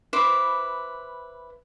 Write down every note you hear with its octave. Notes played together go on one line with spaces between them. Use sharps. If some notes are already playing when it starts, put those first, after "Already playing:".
E4 B4 C5 D6